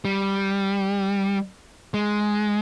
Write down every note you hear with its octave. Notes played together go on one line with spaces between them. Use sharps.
G3
G#3